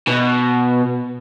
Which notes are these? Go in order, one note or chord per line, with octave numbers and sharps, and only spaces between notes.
B2